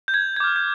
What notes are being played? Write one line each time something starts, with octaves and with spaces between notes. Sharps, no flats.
G6
G#6
G#6
D6 F6 G6
G6